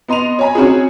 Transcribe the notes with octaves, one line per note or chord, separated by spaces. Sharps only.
B3 D#5 C6 D#7 F7
C#5 D#5 G#5 A#5 B5
C4 C#4 F#4 G#4